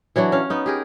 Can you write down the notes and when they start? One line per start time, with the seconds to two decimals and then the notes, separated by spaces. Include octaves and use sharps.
0.16 E3 F#3 D4 F#4
0.32 C#4 F5
0.50 B3 D#4
0.66 G4 G#4 A#4